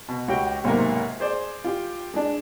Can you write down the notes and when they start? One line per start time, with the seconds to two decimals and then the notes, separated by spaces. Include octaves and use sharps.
0.09 B2
0.28 C#2 F#4 G4 G5
0.64 B1 G#2 C3 A#3
1.20 G#4 C5 D5
1.64 F4 G4
2.14 G#3 D4